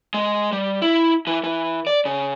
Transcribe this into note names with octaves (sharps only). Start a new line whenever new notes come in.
G#3
G3
E4
E3
E3
D5
C#3